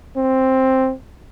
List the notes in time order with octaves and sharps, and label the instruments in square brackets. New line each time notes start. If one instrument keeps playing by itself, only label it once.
[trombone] C4